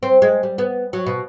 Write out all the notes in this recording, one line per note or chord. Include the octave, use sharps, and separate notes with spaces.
C4
G#3
G3
B3
F#3
B2